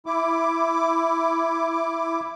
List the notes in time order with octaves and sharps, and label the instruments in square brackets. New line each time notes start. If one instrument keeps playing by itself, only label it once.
[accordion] E4 D6